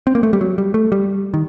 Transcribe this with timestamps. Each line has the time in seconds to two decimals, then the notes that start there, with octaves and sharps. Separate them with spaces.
0.07 C4
0.15 A#3
0.23 A3
0.33 G3
0.41 F#3
0.58 G3
0.74 A3
0.92 G3
1.34 D#3